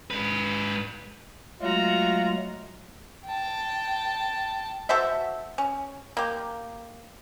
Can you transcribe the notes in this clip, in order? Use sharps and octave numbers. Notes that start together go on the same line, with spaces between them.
G#2 B4
F#3 G#3 A3 F4 F#4 A#5
G5 A5
F#4 A4 C5 E5
C#4
A#3 G4